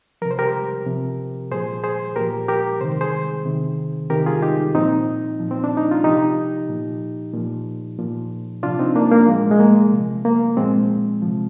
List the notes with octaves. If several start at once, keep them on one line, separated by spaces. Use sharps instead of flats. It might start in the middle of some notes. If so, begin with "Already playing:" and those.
C3 F3 A#4
C5
G4 A#4
C3 F3
A#2 F3 G#4 C5
G#4 C5
A#2 F3 G4 A#4
G4 A#4
C3 D#3 C5
G#4 C5
C3 D#3
C3 D#3 G4 A#4
F4 G#4
D#4 G4
A#2 F3 C4 D#4
A#2 F3
C4
D4
D#4
F4
C3 F3 D#4 G4
A#2 F3
A#2 F3
A#2 F3
C3 F3 D4 F4
C4 D#4
A#3 D4
A#3
A#2 F3 G#3
G#3
A#3
C3 F3
A#3
A#2 F3 G#3 C4
C3 F3